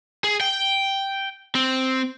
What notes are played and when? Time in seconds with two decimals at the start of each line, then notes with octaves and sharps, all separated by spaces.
0.24 G#4
0.41 G5
1.55 C4